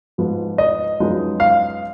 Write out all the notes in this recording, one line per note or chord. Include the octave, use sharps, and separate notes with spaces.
G#2 F3 B3
D#5
F#2 F3 G#3 B3 D#4
F5